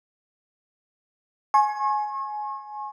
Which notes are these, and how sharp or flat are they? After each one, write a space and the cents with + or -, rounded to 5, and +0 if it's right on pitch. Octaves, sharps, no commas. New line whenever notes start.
G#5 +20 C#6 -40